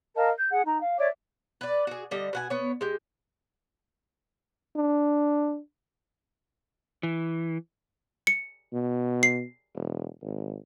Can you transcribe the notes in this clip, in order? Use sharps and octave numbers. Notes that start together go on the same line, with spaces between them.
A#4 D#5 F5 A5
G6
G#4 F#5
D#4 A#5
F5
C#5 D5 E5 D6
B4 D5
F#4 G#4
D3 G3 D#5
B2 F#5 G#5
B3 C#5
G#3 G4
D4
E3
C#7
B2
C7
E1
G#1